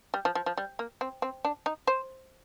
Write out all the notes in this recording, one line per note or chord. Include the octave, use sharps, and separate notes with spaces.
G3
F3
F3
F3
G3
A#3
C4
C4
D4
D#4
C5